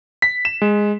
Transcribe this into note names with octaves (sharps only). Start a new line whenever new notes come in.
B6
E7
G#3